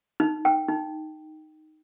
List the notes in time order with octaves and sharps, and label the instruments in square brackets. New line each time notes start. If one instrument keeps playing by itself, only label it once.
[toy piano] D#4
G5
D#4